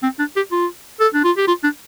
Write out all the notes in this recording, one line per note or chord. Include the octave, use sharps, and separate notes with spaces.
C4
D4
G4
F4
A4
D4
F4
G4
F4
D4